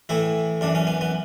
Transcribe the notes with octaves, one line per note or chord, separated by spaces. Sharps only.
A2 E3 E4
F#2 E3 D4
C#4
B3
B3